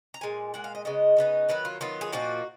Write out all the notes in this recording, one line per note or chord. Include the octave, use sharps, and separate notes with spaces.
A#5
A#2 G#3 G#5
A#2 G#3 F#5
F5
D#5
C#3 G#3 B3 D#5
C#3 G#3 B3 D#4
D#3 F#3 B3 B4
F4
D#3 F#3 B3 F4
G#4
A#2 F3 A#3 D#4 F#4